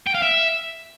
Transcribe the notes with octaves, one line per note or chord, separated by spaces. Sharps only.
G5
F5
E5